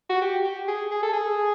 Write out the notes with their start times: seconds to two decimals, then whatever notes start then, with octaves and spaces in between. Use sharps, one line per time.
0.09 F#4
0.22 G4
0.44 G4
0.68 G#4
0.91 G#4
1.03 A4
1.13 G#4